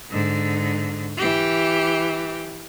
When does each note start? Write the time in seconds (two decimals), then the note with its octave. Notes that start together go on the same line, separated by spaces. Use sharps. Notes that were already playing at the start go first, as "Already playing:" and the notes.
0.12 G#2 D3
1.18 E3 G4